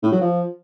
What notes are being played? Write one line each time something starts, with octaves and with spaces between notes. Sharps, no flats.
A2
F#3
F3